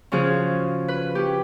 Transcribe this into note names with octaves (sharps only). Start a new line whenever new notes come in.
C#3 F3 C#4 F#4 G#4
B4
C#4 G4